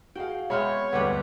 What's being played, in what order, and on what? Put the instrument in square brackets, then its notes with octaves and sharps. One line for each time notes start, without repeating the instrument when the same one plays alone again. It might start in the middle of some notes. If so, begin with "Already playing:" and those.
[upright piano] F#4 G#4 F5 [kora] G5
[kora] G#3 B3 C4 [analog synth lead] C#5 [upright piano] E5 B5 F6
[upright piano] E1 D2 G2 [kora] D3 D4 G4 [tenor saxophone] B3